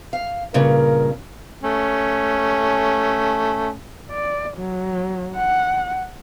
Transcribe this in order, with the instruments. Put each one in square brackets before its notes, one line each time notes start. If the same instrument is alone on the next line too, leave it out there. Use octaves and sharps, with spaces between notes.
[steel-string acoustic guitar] F5
[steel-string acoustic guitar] G2 A#2 C#3 [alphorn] A#4
[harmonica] A3 C#4
[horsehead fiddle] D5
F#3
F#5